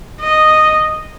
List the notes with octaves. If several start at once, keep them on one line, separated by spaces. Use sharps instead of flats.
D#5